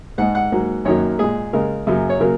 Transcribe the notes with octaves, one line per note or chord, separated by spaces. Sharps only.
G#2 G#3 F#5
F#5
G#2 F#3 A#3
F#2 D#3 F#3 A#3 C#5
A#2 G#3 G#4
C#3 G#3 A#4
F#2 C#3 F#3 A#3
C#5
C#3 F#3 A#3 A#4